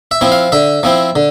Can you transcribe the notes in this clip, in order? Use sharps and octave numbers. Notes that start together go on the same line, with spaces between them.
E5
F3 C4 E4
F5
D3 E5
F3 C4 E4
D3